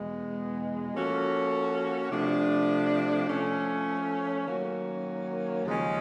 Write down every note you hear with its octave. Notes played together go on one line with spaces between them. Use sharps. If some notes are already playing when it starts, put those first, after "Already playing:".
Already playing: E2 B2 G#3 B3
F3 A#3 C#4 F#4 A4
C3 F3 A3 D4
F3 A3 C#4
D#3 F#3 A#3 C#4 F#4
D#2 C#3 F3 G#3 C#4